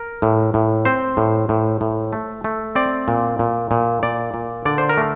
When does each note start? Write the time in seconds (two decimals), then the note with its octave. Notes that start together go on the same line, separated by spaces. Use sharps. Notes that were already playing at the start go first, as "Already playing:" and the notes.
Already playing: A#4
0.22 A2
0.54 A2
0.85 C4 C5
1.17 A2
1.49 A2
1.81 A2
2.13 A3
2.44 A3
2.75 C4 D5
3.08 A#2
3.39 A#2
3.71 A#2
4.03 A#2 D5
4.34 A#2
4.65 D3 D5
4.78 C5
4.89 A#4
4.97 A3